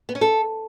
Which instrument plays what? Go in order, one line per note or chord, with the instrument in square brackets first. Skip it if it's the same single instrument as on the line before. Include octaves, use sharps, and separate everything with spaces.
[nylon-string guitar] B3
C#4
A4